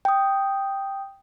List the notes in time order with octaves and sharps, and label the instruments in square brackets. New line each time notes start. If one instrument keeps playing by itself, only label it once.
[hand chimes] G5 D#6